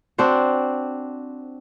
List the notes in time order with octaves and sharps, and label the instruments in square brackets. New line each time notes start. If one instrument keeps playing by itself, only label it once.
[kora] C4 D4 F#4 C5